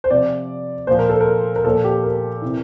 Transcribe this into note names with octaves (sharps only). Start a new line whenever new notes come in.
C5
C3 F3 D5
A#2 F3 C5
A#4
A4
A#4
A#4
A#2 F3 A4
G4
A#4
C3 E3